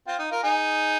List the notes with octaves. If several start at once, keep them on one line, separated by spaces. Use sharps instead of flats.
C4 F4
D#4
F4 A#4
D#4 G#4